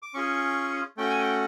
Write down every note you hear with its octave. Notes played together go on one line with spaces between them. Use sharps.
D6
C#4 F4 G#4 C#6
A3 C#4 F#4 G5
G#5
G5